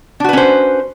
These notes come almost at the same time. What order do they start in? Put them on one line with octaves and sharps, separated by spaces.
D4 F#4 B4 C#4 C5